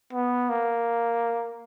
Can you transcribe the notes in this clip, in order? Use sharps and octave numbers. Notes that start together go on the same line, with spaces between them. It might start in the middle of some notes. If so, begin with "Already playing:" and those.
B3
A#3